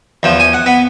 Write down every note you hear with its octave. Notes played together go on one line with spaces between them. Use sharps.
E2 F3
G#5
F#5
B3